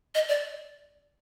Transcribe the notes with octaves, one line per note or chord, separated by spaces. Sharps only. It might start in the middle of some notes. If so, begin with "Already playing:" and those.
D#5
D5